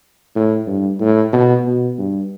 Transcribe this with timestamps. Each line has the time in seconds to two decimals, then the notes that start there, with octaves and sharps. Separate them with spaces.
0.35 A2
0.67 G2
1.00 A2
1.33 B2
1.66 B2
1.98 G2